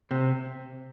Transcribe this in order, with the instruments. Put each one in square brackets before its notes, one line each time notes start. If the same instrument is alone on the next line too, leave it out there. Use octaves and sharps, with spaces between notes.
[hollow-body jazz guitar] C3